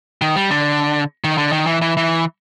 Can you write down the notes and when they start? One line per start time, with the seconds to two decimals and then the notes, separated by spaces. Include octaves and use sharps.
0.22 D#3
0.36 G3
0.50 D3
1.24 D#3
1.38 D3
1.52 D#3
1.67 E3
1.82 E3
1.97 E3